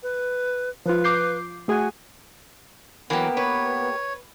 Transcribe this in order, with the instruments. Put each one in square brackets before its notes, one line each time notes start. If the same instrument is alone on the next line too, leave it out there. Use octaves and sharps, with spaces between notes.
[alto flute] B4
[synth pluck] F3 F4 [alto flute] B4
[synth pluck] D6 G6 C7
[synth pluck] A3 G#4 G#5 [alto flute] F#4
[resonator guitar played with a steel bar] E3 F#3 [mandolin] A#3 G4 [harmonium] B3
[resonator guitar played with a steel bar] B4 [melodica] C#5